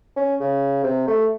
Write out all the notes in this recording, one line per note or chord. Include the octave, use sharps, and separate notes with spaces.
C#4
C#3
C3
A3